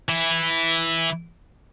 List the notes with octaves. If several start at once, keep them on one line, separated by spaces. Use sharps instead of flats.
E3 E4